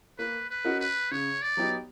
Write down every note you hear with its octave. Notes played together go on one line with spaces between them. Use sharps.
A#3 B4
B4
C#4 F#4 A#4 D#5
B4
C#3 C#5
D5
F#3 B3 D#4 G4